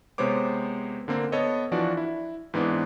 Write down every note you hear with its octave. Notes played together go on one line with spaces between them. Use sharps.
C3 G#3 B3 C5 C#5 D6
D3 A#3 C4
B3 A4 C#5 D#5
E3 F3 D4 F#4 D5
E4
G#2 E3 B3 C4 D4